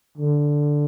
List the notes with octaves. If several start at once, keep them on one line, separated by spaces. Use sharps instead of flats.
D3